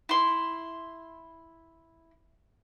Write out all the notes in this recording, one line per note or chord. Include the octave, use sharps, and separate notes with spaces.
E4 C6